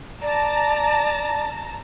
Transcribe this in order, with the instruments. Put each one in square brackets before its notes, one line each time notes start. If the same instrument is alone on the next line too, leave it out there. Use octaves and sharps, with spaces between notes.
[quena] D5 [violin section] A5 A#5